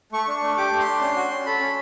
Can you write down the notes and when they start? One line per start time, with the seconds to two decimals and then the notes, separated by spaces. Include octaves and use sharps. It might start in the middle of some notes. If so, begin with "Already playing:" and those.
0.12 A3 C#6
0.28 D4
0.43 A3
0.57 G4 D6
0.73 A3
0.80 C6
0.87 D4
1.01 C#4
1.16 F#4
1.31 C#4
1.46 A4 B5
1.60 C#4